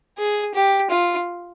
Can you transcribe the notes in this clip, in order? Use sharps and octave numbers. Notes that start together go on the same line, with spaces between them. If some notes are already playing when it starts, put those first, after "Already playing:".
G#4
G4
F4